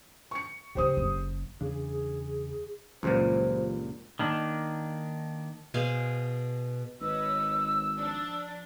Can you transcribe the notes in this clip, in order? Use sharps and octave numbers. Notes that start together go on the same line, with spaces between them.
C#6 C#7
C#3 D4 G4 C5 D#6
F#1
E2 C#3 D4 G#4
C#2 G2 A#2 E3 F#3 G3 C5
D#3 A#3 D4
B2 G#4 C5 F5
G#1 B4 C#5 D#5 E6
F3 D4